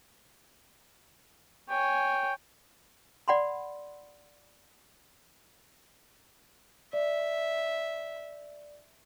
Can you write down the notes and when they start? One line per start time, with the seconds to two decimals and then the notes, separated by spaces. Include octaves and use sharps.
1.69 C#5 G5 G#5
3.28 D5 F#5 B5 C6
6.93 D5 E5